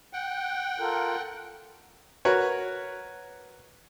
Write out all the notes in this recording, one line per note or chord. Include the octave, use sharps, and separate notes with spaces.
F#5 G5
F4 A4 A#4
F#4 A#4 B4 C#5